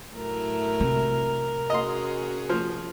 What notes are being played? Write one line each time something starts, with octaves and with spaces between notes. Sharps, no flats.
A2 F#3 E4 A#4
C3
C#4 F#4 G#4 D#5 C6
F3